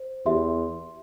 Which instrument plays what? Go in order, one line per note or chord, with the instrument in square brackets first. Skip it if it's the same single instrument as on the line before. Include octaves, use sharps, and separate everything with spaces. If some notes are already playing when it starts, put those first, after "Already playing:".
Already playing: [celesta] C5
[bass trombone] E2 [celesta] G4 E5 C6